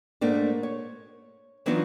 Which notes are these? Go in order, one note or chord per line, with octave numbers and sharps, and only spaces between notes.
G#2 A3 A#3 D4
C#5
E3 F#3 B3 D4 D#4 F4